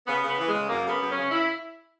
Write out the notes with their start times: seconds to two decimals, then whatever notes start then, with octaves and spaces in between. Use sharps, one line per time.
0.07 C#3 B3
0.21 C#3
0.28 B3
0.38 E3
0.48 C#3 G#3
0.68 F#2 A#3
0.85 C#3 B3
0.99 F#2
1.11 C#3 C#4
1.31 E4